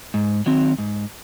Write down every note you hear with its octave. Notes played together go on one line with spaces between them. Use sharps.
G#2
D#3 F#3 C4
G#2